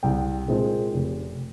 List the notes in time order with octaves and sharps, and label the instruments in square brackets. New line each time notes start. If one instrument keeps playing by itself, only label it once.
[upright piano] C2 G5
A#2 G#3 C4 D#4
F1